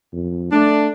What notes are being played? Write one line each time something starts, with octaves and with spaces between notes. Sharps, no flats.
F2
A3 D4